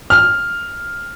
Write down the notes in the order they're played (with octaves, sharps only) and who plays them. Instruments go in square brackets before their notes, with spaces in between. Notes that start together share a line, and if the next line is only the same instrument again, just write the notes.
[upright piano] F6